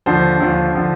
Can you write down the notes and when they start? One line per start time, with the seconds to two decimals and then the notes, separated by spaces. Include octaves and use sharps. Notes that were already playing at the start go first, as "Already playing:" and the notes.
0.06 D#2 D3 F3 C5
0.40 D#2 D3 F3
0.75 D3 F3